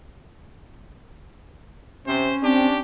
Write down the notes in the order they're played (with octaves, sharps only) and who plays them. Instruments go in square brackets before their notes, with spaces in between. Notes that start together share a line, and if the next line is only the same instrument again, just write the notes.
[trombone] C3 [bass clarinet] C#4 [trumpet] C5
[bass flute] C4 [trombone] D4 [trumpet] G4